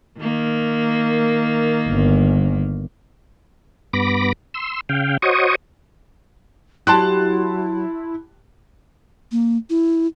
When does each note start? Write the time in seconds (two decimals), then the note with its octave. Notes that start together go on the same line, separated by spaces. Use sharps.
0.19 D#3 A#3
1.89 G1
3.93 G2 B3 B5 D6 A#6
4.54 C6 E6
4.89 C#3 F5 G5
5.22 F#4 C5 C#5 D#5 C#6 D#6
6.87 F#3 E4 G4 A5 C6 F#6
9.32 A#3
9.70 E4